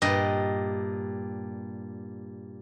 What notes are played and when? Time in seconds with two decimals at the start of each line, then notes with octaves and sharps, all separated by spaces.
0.02 G2 A#2 D#5